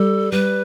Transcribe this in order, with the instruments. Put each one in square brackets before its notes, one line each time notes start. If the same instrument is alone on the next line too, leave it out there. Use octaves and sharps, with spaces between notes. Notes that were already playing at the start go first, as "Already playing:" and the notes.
Already playing: [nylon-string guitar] G3 [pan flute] A4
[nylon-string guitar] G3 [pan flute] B4